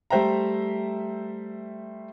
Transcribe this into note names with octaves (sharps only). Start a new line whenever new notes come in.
G3 A3 C5 E5 G5 A#5